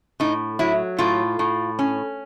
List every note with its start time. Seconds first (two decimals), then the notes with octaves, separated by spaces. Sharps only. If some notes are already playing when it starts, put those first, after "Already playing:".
0.20 A2 D#4
0.59 F#3 E4
0.98 A2 F4
1.39 A2
1.79 C#4